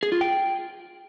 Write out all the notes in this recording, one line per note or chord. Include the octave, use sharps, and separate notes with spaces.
G#4
F4
G5